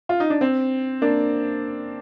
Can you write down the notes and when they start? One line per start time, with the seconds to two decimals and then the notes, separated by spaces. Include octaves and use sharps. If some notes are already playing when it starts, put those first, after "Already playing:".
0.09 F4
0.20 D#4
0.30 D4
0.41 C4
1.02 A#3 D4